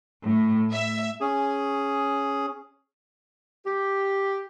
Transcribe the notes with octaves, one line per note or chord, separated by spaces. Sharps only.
A2
E5
C#4 G#4
G4